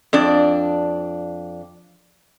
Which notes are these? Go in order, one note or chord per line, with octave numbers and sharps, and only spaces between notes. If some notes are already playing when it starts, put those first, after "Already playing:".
F2 D4 D5